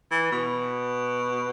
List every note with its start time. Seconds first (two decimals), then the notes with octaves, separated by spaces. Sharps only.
0.11 E3
0.32 B2